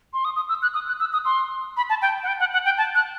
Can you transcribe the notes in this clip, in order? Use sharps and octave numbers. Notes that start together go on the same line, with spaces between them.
C6
D#6
D#6
E6
F#6
D#6
F#6
E6
D#6
C6
B5
A5
G5
F#5
G5
F#5
F#5
G5
A5
F#6